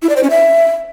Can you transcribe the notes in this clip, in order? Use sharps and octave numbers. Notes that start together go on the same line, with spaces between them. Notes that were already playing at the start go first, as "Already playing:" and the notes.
E4
D5
C5
C#4
E5